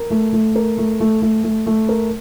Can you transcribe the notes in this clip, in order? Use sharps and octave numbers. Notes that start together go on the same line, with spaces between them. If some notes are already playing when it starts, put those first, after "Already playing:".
Already playing: A#4
A3
A3
A#4
A3
A3
A3
A3
A3
A#4